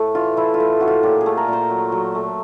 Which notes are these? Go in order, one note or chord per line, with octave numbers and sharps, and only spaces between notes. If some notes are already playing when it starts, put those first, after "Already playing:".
Already playing: A2 A3
E3 F4
E3 E4
F4
A2
A2 F#4
F4
A#2 G4
G#4
A3
A#4
A#2 C5
F#3
F#3
A3